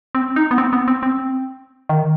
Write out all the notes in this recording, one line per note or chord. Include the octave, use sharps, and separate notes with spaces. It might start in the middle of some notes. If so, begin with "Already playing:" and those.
C4
D#4
B3
C4
B3
C4
C4
D#3